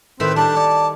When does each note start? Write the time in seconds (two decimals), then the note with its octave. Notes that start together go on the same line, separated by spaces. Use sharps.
0.20 A2 D#3 C4 B4 E5
0.36 G3 D4 A5
0.56 C#5 D5